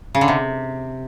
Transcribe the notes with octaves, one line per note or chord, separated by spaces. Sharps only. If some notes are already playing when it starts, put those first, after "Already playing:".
C#3
D3
C3